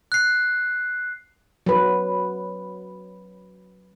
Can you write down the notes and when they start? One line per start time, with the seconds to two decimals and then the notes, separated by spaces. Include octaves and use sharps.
0.12 F#6 C7
1.66 F#3 B4